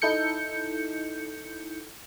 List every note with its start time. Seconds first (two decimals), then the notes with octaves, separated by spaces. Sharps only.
0.02 D#4 E4 A4 G6 C#7